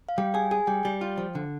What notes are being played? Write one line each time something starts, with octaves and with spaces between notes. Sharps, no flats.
F5
G3 G5
G#4 G#5
G#4 G#5
G3 G5
G3
F4
F3
D3